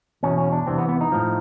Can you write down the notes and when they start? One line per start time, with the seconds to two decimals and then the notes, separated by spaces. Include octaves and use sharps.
0.23 E2 B2 C#4
0.38 C#4
0.52 D4
0.66 E2 C3 E3 C4
0.78 B3
0.89 B3
1.01 D#4
1.12 A2 F3